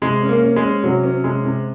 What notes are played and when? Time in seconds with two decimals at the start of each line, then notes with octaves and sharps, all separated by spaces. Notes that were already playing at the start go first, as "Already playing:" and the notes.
0.02 C3 G#3
0.22 C#4
0.29 A#3
0.43 C#4
0.56 G#3
0.63 C#4
0.84 C3 F#3
1.04 C#4
1.24 C3 G#3
1.45 C3